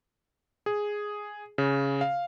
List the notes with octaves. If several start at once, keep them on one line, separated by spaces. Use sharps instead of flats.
G#4
C#3
F5